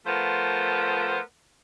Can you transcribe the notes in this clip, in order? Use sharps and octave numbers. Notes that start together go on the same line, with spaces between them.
F3 A3 B3 F4 A#4 C5